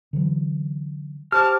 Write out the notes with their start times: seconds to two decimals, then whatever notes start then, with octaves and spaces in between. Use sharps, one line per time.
0.13 D3 E3 F#3
1.32 G4 C5 A5 D6 F6